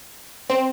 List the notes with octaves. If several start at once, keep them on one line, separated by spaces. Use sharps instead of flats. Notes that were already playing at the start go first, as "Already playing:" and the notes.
C4